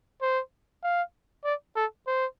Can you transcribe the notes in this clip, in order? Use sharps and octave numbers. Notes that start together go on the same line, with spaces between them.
C5
F5
D5
A4
C5